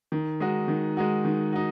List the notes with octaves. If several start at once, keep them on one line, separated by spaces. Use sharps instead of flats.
D#3
G#3 D#4 F#4
D#3
G#3 D#4 F#4
D#3
D#4 F#4